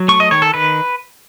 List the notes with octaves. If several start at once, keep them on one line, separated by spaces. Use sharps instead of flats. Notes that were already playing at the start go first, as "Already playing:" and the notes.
Already playing: F#3
A3 C#6
D#5
D#3 C#5
A4
D#3 B4